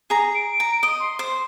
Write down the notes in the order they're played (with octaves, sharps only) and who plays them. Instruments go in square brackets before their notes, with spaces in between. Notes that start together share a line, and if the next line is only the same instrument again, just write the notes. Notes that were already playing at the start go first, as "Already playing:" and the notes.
[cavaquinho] G#4 A#5
[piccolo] D7
[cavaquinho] A#5
D#5
[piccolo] C6
[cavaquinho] C5